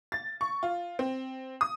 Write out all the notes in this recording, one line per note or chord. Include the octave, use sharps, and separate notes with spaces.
A6
C#6
F4
C4
D#6